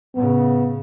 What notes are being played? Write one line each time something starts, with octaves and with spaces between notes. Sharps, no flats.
A2 C#3 B3